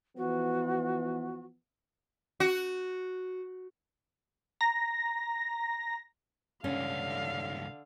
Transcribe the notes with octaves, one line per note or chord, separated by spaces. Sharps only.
E3 F3 B3 F#4
F#4
A#5 A#6
C#2 G2 D3 C#4 F5